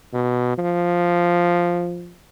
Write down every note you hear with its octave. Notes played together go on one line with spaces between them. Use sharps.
B2
F3